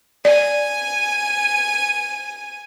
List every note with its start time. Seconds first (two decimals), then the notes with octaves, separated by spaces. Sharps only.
0.25 D5 G#5 D#7